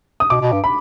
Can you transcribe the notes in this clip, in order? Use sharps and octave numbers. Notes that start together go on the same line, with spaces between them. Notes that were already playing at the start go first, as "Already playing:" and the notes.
D#6
B2 D6
B2
G2
B5